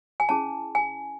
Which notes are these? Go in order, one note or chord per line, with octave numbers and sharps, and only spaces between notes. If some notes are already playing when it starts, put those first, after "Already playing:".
G#5
C#4 E4 G#4 A5
G#5